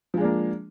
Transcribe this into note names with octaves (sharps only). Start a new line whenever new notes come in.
F3 G#3 A#3 D4